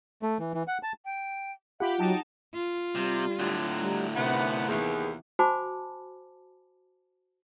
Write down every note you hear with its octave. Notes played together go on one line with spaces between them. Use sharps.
A3
E3
E3
F#5
A5
G5
F4 G4 E5 F#5 B5
F#3 D#4 G5 A5
F4
C3 G3
A2 D3 F#3
G3
C3 D#3 B3 E5
D#2 E3 B3 G#4
F#4 C5 G#5 A5 B5 D6